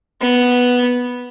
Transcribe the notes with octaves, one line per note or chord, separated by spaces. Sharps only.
B3